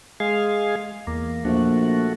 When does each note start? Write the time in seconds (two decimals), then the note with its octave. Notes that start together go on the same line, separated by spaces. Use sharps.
0.20 G#3 G#4 F5
1.07 E2 A#3
1.45 A#1 A3 F#4